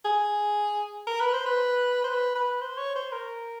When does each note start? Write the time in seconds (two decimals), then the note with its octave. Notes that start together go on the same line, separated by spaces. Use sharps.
0.05 G#4
1.07 A#4
1.21 B4
1.33 C5
1.46 B4
2.04 C5
2.09 B4
2.35 B4
2.61 C5
2.78 C#5
2.96 C5
3.12 A#4